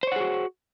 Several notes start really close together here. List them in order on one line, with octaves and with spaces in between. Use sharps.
C5 C#5 F#5 G#4 F#4